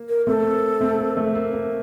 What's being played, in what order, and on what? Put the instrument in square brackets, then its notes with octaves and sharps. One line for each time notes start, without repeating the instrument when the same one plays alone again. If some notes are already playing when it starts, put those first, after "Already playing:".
Already playing: [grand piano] A#3
[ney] A#4
[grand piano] A3 C4 [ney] A4
[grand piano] A#3
A3 C4
A#3
A3
A#3
A#3